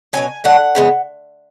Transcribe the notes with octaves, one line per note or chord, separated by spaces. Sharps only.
B2 F#3 C#4 G#5
A2 F#3 A3 D4 F#5
C#3 E3 G#3 B3